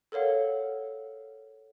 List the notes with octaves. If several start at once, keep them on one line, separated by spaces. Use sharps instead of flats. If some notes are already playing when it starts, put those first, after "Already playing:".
A4 A#4 C#5 F5 F#5